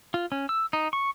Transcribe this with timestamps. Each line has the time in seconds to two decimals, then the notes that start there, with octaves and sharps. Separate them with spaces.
0.14 F4
0.32 C#4
0.49 E6
0.73 D#4
0.93 C#6